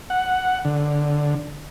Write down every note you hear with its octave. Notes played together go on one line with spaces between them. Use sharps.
F#5
D3